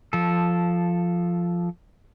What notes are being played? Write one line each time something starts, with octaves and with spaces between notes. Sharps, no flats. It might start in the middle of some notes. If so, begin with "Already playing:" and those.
F3 A4